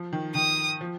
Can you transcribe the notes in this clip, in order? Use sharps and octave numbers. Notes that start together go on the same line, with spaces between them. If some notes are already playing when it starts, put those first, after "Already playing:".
Already playing: F3
D#3
D#3 D#6
F3